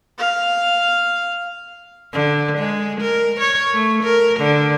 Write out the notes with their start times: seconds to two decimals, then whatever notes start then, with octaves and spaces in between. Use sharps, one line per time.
0.18 F5
2.13 D3
2.58 G#3
3.01 A#4
3.40 C#5
3.73 A3
4.04 A#4
4.40 D3